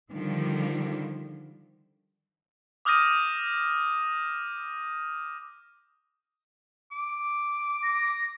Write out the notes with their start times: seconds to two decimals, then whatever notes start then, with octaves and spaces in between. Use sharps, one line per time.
0.12 D3 D#3 F3 G3
2.85 D6 D#6 F6 G6 A#6 D#7
6.92 D6
7.83 A#6